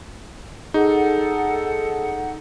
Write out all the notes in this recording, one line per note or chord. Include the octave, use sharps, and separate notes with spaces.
D#4 G#4 A4 F#5